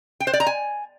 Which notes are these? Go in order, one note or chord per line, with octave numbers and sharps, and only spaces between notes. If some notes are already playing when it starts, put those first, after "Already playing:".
G5
C5
D5
A#5
G#5